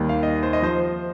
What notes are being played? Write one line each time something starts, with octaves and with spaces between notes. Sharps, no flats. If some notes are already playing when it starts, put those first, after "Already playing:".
Already playing: D#2 D#3 G3
F5
D#5
C5
D#5
F3 C5